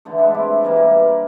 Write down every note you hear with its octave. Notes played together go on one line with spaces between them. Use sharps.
D3 E3 A3
G#3 D4 E4 A4
C4 D4 E4 G4
B2 E3 G3 A#3
A#3
D5